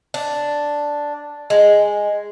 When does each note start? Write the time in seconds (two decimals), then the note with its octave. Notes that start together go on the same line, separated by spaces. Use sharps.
0.14 D4
1.50 G#3